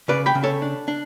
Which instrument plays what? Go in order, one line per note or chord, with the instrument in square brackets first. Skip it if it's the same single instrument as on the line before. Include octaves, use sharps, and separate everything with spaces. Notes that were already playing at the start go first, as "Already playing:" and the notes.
[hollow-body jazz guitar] C#3 B4 D5
G5 B5
C#3
A4 C#5
D4
D4